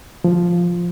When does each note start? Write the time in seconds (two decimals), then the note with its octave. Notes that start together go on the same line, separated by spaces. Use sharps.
0.24 F3